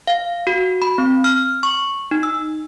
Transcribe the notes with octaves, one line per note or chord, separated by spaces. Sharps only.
F5
F#4
B5
C4
F6
C#6
D#4
E6